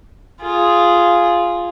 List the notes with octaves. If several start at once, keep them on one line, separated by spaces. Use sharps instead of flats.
F4 G#4